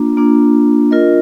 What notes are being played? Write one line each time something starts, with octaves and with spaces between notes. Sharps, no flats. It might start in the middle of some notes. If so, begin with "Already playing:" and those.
Already playing: A#3 D4 F4
A#3 D4 F4
D4 F4 A#4 D#5